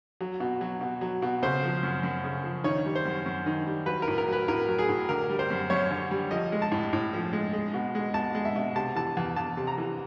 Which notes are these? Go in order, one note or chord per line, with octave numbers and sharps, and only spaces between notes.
F#3
B2
F#3
B2
F#3
B2
C#3 C5
F3
F#2
F#2
C#3
F3
D#3 C#5
G3
C5
F#2
F#2
D#3
G3
F#3 B4
A#4
A2
A#4
F#3 B4
A2 A#4
F#3
G#4
A2
D3 A#4
G3
C5
F#2
F#2 C#5
D3
G3
F3 D#5
G#3
A5
A2
A2
F3
G#3
G#3
B2
G#3
B2 A5
G#3
E5
B2
C3 A5
E3 A5
E2
E2 A5
C3
A#5
E3